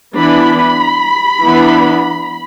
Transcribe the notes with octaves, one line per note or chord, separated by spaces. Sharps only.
E3 B3 D4 B5
E3 B3 D4